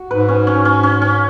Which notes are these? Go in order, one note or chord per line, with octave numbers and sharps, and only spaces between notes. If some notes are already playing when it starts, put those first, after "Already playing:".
Already playing: F#4
G#2 B4
C#4
C#4
C#4
C#4
C#4